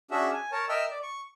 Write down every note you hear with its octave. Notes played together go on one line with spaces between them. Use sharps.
C#4 D4 F#4 G#4 E5
G#5
A#4 C#5 A5
A#4 D#5 E5 G5 E6 F6
D5
C#6